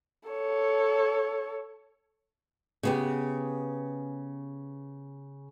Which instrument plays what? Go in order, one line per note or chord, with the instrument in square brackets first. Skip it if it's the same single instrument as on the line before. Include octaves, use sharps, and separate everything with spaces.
[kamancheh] A4 C#5
[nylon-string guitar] C#3 B3 G4